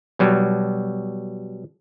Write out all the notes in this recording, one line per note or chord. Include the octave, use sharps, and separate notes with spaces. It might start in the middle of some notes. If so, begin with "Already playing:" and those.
B2 F#3 G3